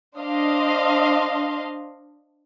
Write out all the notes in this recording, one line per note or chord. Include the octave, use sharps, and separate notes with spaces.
D4 C5 D#5 F5 C6